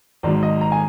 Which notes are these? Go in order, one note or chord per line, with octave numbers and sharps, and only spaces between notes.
G#1 G#2 F#3 D5
D#5
A#5
G#5